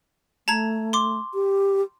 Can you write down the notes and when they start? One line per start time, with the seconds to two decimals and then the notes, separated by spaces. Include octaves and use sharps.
0.48 A3 A5 A#5 G#6
0.93 C6 D6
1.34 G4